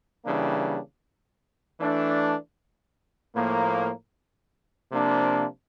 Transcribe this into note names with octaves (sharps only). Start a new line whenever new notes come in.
C#3 E3 G3 A#3 D4
E3 A3 D4
A2 F3 A#3
C3 F3 A#3 D4